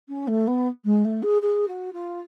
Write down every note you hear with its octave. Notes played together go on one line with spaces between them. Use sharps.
C#4
A3
B3
G#3
A3
G#4
G#4
F#4
F4